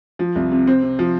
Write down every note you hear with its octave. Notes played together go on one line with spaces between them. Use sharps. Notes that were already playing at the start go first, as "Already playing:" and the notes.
F3
C2
C3
C4
C3
F3